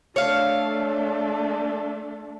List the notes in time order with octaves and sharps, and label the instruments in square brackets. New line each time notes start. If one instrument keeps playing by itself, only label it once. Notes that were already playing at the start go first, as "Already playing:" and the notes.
[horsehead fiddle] A3 D4 [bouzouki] C#5 F5